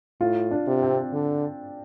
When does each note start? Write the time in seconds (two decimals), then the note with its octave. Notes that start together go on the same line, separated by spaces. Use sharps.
0.21 A2 F4
0.51 D4
0.67 C3
0.82 C4
1.13 D3